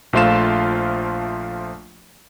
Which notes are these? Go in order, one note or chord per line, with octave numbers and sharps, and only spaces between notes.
A#1 F3 A3 F4 F5 E7